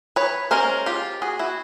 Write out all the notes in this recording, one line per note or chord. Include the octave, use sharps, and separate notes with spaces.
B4 C#5
G#3 C#4 A#4 C5
F4 G4
F#4 G#4
E4 F#4